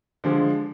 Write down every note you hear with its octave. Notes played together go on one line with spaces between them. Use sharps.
D3 F3 G#3